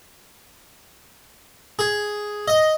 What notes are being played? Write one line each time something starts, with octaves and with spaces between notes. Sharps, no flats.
G#4
D#5